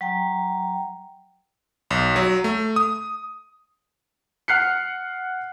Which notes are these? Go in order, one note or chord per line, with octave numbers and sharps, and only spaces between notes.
F#3 G5 A#5
B1
F#3
A3
D#6
F#5 F6 F#6 C7 C#7